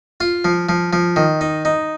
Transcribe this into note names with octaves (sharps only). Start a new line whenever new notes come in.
F4
F3
F3
F3
D#3
D#4
D#4